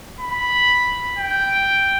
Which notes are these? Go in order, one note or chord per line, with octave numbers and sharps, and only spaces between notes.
B5
G5